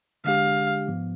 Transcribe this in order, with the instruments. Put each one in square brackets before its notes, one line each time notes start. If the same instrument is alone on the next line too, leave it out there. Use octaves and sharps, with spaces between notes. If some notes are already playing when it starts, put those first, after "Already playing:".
[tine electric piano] D3 G#3 D4 G4 [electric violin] F5
[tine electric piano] G#2 F3 B3